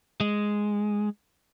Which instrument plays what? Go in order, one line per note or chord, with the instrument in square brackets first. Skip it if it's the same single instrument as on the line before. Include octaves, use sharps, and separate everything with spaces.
[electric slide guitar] G#3